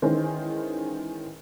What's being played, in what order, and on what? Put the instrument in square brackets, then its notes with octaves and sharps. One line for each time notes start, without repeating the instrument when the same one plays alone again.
[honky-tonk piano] D#3 E3 G#3 C#4 C5